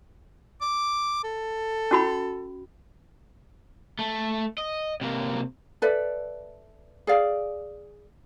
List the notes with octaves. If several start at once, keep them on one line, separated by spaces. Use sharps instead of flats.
D6
A4
C#4 F#4 B5
A3
D#5
C3 A#3
A4 B4 D5 E5
G#4 D5 F5